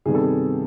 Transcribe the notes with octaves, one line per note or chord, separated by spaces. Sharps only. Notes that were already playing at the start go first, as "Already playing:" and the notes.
C3 D#3 G3 B3 G#4
A4
G#4